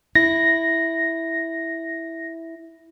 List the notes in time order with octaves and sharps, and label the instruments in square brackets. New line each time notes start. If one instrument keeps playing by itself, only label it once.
[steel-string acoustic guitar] E4 [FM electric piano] A#6